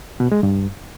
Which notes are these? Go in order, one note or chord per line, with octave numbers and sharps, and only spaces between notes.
B2
G#3
G2